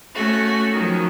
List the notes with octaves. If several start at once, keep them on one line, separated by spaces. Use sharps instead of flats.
A3 C#4 F#4
D#3 F3 F#3